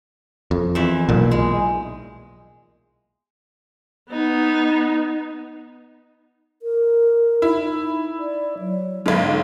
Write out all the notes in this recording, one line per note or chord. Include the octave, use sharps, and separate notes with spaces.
F2
E2 F3 E5
B1 A#2
G#3
B3 D#4
A#4
D#4 E4
D5
F#3
B1 G#2 D3